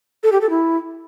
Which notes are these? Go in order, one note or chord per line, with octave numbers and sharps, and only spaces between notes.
A4
G4
A4
E4